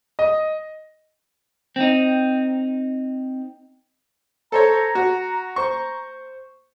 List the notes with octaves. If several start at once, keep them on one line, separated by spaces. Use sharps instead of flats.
D#5
C4 D#4
A4 C5 C#5 A#5
F#4
C5 C#6